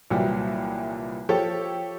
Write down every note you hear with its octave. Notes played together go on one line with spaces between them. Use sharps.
C2 A#2 E3 F#3 G3
F3 G4 A4 C#5